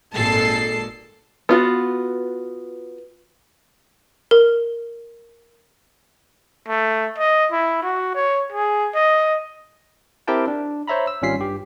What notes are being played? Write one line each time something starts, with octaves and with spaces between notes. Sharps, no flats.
G#1 A#2 G#3 A4 A5 C7
B3 F4 F#4
A#4
A3
D#5
E4
F#4
C#5
G#4
D#5
C4 E4 G4 A#4 G5 A5
D4
C5 C#5 E5 A#5 B5
E6
G#1 G3 C#4 F4 B6 C7
G2 G4